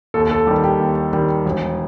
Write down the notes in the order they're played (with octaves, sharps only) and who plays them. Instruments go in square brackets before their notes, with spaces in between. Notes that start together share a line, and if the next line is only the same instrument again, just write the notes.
[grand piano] D#2 A4
A4
G3 G4
D#3
G4
D#2
D#3 G3
E1